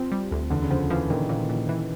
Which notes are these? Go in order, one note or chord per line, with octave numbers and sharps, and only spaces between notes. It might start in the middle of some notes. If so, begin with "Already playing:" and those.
Already playing: F3 C4
G3
D2
E2 D3
C#3
D3 F3
E3 F3
A#2 D#3
A#2
A#2
E3